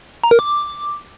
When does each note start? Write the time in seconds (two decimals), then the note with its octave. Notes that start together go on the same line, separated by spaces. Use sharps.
0.24 A#5
0.31 A#4
0.39 D6